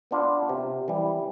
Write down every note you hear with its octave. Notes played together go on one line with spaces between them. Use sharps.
B3 D4 F4
C3
E3 G3